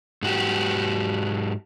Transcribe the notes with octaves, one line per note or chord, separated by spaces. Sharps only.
G#2 F#4 G4